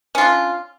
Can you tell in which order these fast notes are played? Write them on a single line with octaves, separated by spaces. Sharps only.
C#4 F4 D4